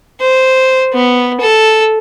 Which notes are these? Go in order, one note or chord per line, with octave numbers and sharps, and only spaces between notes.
C5
B3
A4